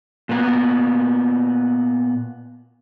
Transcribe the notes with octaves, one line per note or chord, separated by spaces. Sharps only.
A#2 B3